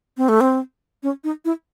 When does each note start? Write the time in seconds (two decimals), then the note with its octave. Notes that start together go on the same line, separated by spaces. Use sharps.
0.17 C4
0.29 A3
0.41 C4
1.03 C#4
1.24 D#4
1.45 E4